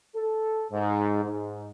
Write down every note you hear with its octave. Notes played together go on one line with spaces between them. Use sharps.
A4
G#2
G#2